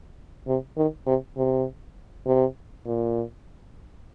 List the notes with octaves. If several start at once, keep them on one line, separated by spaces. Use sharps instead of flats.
C3
D#3
C3
C3
C3
A#2